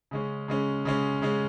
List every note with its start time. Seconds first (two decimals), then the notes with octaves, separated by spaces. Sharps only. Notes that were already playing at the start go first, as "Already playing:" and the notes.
0.11 C#3 G#3 C#4
0.48 C#3 G#3 C#4
0.85 C#3 G#3 C#4
1.22 C#3 G#3 C#4